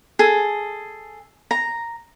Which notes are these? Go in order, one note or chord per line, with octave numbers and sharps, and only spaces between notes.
G#4 A4
A#5